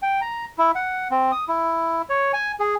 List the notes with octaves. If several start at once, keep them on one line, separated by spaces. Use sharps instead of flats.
G5
A#5
E4
F#5
C4
D#6
E4
C#5
G#5
G#4